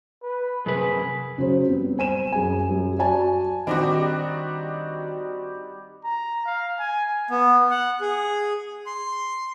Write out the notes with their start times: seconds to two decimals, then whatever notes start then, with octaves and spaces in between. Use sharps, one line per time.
0.23 B4
0.66 F#2 C3 G#4 B4
1.38 C#3 F#3 C5
1.68 G3 B3 C4
1.98 C5 G#5 D#7 E7
2.32 F#2 G#4 G#5
2.69 F#2 G4
2.98 F#4 D5 G#5 A5
3.67 D#3 G3 C4 D4 D#4 F#4 G4 D5
6.05 A#5
6.46 F5
6.79 G#5
7.30 B3
7.71 F#5
8.01 G#4
8.86 C6